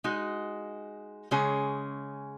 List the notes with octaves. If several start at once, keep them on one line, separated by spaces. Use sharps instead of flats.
G#3 D#4 F#4
C#3 G#3 C#4 G#4